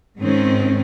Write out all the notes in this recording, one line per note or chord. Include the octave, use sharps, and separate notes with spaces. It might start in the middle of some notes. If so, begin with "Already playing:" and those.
G#2 D#3 C4 C#4